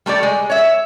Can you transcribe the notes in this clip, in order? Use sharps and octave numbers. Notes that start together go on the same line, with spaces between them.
G3 A3 G4 D5
G#3
C#5 E5